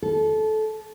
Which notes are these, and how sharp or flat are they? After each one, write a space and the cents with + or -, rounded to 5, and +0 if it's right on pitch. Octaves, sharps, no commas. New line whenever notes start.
A4 -20